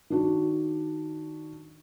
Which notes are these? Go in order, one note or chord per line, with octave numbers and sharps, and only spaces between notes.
D#3 D4 F#4